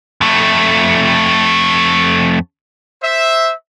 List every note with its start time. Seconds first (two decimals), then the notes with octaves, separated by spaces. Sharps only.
0.21 F2 A3
3.01 C5 E5